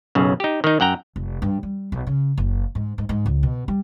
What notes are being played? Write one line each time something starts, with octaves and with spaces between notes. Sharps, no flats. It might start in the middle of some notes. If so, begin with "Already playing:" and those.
B1 F#2 C#3
D#4 G4
D#3 D#4
F#2 F#5 G5 A#5
F1
G2
G3
B1
C#3
F#1
G#2
G#2
G#2
C#2
B2
G3